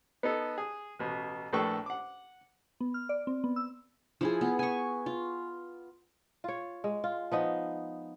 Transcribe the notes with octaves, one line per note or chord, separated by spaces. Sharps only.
B3 D#4 A4
G#4
A1 B2
A#1 A2 A4 B4 G5 C#6
F#5 D6
B3
F6
D5
C4
B3
E6
F3 E4 G#4
B3
G#5 C#6
F4
F4 C#5
G#3
F4
F3 B3 D#4